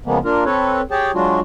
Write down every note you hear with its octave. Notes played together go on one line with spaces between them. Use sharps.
C#3 F3 G#3 A#3 B3
A#3 D4 F4 A#4
C4 A4 B4 C#5
G4 G#4 C#5 G5 A5
F#3 G#3 D4 F4 F#4